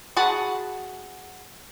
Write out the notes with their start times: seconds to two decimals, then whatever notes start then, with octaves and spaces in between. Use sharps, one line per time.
0.17 F#4 G#4 F#5 A5 B5